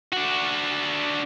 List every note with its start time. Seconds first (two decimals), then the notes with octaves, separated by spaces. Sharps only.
0.13 D4 F#4